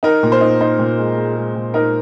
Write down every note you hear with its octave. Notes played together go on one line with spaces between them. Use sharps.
D#4 A#4
A#2
C5
D#4
D#4 C5
A#2
G#3
G#3
G#3
A#2
D#4 A#4